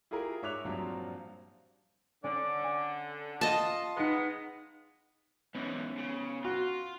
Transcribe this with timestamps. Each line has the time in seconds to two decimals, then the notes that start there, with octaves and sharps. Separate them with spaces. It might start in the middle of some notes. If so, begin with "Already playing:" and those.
0.11 E4 F4 G4 G#4 A#4
0.42 G#2 C#5 E5 D6 F#6 F7
0.65 G2 A#2 F3 F#3 A#3 C4
2.24 D3 C#4 D5
2.64 G#5
3.41 F4 D#5 A5
3.97 G#3 B3 D#4 C6
5.55 G#2 E3 B3 C#4
5.98 C#3
6.45 F4 F#4